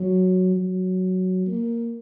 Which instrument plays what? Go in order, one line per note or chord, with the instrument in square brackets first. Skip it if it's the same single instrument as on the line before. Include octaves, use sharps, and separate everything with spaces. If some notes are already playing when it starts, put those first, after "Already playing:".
Already playing: [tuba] F#3
F#3
A#3